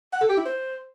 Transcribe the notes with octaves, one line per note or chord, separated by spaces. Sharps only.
F#5
A4
G4
E4
C5